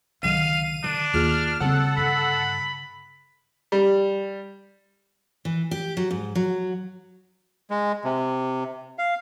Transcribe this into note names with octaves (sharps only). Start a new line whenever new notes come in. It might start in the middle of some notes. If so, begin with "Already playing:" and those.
C#2 D3 D#3 F#3 F5 D#7
D3 D4
D#2 A#3 F4 G#4 F6
D#2 C#3 G3 C4 A4 F#5
G2 D3 B5
G3
E3
G4
F#3
G#2
F#3
G#3
C3
F5